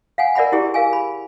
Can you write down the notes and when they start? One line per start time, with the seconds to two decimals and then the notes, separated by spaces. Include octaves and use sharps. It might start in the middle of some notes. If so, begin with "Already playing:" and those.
0.18 F5 F#5 G#5
0.35 A#4 D5 E5 F#5 B5
0.52 E4 G4 G#4
0.74 G#4 A#4 F5 G#5
0.93 B5